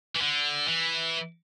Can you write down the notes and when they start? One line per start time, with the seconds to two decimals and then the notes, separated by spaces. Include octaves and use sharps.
0.16 E3
0.22 D3
0.68 E3